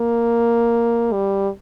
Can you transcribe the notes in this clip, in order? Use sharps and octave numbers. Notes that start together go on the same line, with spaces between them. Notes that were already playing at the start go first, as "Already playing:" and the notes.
Already playing: A#3
G3